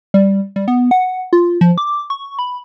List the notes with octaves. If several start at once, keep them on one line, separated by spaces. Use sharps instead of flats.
G3
G3
B3
F#5
F4
F3
D6
C#6
B5